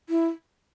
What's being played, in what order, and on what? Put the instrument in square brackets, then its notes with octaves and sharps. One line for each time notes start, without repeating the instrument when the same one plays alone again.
[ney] E4